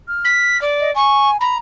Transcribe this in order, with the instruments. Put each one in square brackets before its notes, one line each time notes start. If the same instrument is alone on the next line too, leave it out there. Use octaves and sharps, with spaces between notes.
[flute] F6
[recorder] B6
D5
[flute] D#5
[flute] G#5 [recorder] C#6
[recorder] A#5 [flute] B5